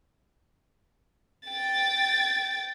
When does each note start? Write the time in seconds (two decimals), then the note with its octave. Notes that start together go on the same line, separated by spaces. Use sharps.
1.48 G5 A6